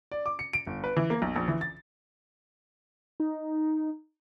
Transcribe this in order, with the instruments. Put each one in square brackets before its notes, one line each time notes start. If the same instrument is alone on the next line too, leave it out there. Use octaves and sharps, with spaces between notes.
[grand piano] D5
D6
C#7
D7
G1
B4
E3
A#3
B1
A#1
E3
A6
[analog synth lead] D#4